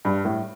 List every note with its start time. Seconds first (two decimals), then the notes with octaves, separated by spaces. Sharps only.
0.05 G2
0.25 A2